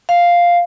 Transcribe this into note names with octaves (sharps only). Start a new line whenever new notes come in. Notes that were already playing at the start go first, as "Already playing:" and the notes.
F5